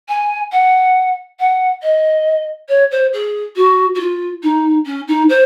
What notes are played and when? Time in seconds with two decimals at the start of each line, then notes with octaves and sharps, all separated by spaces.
0.09 G#5
0.52 F#5
1.39 F#5
1.83 D#5
2.68 C#5
2.91 C5
3.13 G#4
3.56 F#4
3.95 F#4
3.99 F4
4.43 D#4
4.86 C#4
5.08 D#4
5.29 C5